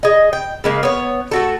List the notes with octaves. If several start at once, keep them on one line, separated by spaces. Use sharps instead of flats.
G#4 D#5
G5
C#3 G#3 A#3
B3 C#5
A3 F#4 A4